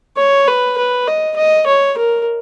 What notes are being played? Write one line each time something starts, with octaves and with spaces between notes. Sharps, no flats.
C#5
B4
B4
D#5
D#5
C#5
A#4